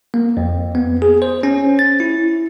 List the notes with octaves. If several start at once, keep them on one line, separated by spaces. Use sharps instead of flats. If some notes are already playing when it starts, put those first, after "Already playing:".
A#3
F2
B3
G#4
C5
C#4
A6
E4